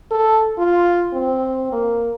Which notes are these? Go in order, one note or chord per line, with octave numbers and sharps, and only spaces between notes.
A4
F4
C4
A#3